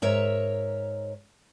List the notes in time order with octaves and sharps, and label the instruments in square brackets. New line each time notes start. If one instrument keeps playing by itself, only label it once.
[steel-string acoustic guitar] G#2 A#4 C#5 E5